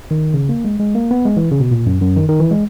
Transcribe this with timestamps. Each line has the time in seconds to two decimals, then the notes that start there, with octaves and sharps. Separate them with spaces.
0.11 D#3
0.34 C#3
0.49 A#3
0.65 G#3
0.80 G#3
0.95 A#3
1.11 B3
1.25 G#3
1.37 E3
1.51 C#3
1.60 B2
1.71 A#2
1.86 F#2
2.01 F#2
2.17 D#3
2.28 D#3
2.40 E3
2.51 G#3